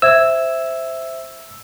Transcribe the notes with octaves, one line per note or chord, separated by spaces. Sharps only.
C5 E5 E6 G#6